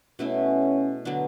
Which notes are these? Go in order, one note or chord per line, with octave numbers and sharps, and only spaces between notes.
B2 A3 C#4 E4
D3 F#3 B3 D4